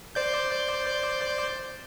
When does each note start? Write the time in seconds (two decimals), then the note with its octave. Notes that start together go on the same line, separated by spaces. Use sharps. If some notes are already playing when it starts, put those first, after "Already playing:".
0.15 C5 D5 G6